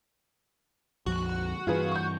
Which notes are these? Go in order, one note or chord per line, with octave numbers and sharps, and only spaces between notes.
A#1 F2 F#4
G2 E3 F4 G#4 B4
C#6 G6